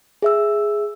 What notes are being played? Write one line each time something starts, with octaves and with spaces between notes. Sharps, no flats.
G#4 E5 E6